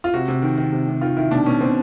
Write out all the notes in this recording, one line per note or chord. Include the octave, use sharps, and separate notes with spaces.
F4
C3 F#4
C3
D#3
D#3
C3
C3
D#3 F4
D#3 E4
B2 D4
B2 C#4
B2 C4